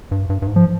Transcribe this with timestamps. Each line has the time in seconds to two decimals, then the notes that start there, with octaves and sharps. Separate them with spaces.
0.11 G2
0.30 G2
0.42 G2
0.47 G#2
0.56 F3